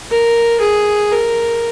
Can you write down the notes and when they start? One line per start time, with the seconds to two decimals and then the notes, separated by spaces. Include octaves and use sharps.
0.11 A#4
0.61 G#4
1.12 A#4